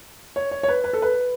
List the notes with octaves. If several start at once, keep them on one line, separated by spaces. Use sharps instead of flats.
C#5
C#5
C#5
B4
B4
A4
B4